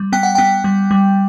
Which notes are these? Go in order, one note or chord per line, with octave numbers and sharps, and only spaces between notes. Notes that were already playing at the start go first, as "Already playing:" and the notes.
Already playing: G3
B3 G5
F#5
B3 G5
G3
G3